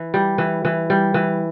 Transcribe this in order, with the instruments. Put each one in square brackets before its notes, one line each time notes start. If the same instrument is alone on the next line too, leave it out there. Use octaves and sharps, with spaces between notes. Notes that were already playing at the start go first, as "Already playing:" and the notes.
Already playing: [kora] E3
G3
E3
E3
G3
E3